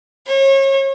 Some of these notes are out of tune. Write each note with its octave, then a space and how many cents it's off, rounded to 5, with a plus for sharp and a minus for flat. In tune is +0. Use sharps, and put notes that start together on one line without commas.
C#5 -35